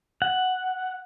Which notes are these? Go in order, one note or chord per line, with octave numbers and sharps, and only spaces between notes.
F#5